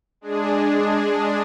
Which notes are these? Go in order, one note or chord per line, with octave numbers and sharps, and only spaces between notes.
G#3 D4 G#4